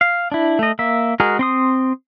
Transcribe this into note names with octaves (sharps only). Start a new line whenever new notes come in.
F5
D4 E4
A3 D#5
A#3 E5
G#3 F#4 G#4 A#4
C4 C6 D#6